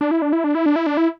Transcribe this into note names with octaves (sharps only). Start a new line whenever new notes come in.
D4
E4
D4
E4
D4
E4
D4
E4
D4
E4